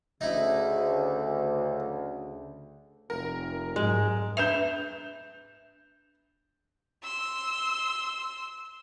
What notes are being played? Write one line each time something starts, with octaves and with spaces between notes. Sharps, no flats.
D2 C#3 D#4 E4
F1 A#4
G#2 F#3 G#3
D4 B4 E5 G6 E7 F7
C6 E6